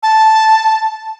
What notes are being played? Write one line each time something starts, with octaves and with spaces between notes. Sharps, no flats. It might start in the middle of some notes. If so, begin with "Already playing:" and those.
A5